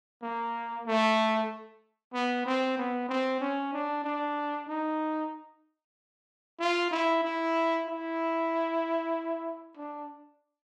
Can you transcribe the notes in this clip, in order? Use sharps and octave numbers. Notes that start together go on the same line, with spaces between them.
A#3
A3
B3
C4
B3
C4
C#4
D4
D4
D#4
F4
E4
E4
E4
D4